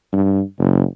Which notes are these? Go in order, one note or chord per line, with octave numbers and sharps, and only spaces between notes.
G2
F#1